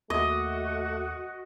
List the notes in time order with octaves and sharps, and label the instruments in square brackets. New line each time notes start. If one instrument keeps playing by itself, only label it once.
[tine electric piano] D#2 E5 D6 [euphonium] A3 [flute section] F#4 [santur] D#5